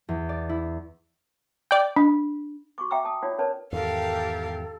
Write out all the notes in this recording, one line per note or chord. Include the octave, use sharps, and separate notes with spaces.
E2
D5
E4
D5 G5
D4
F#4 C#6 D6
E5 F#5 G5 A#5 D6 E6
A5 D#6
D#4 F4 C#5 D5 F#5
C#4 A#4 B4 C#5 D5 A5
E2 G#2 D#3 G4 A4 A#4 F5